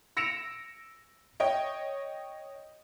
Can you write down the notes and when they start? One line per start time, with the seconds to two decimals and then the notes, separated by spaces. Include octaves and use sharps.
0.17 E6 A#6 C#7 D7 E7 F7
1.40 C#5 D#5 G5